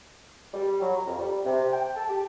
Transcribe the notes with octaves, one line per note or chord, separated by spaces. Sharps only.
G3
F#3
A#5
F2
G3
C3
G5
A5
G4